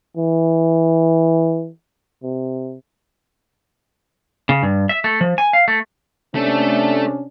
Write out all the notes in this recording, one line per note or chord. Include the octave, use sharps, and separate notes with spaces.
E3
C3
C#3
G2
E5
A3
F3
G#5
F5
A3
C3 A3 C#4 D4 A4